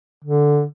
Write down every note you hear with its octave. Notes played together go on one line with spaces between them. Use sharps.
D3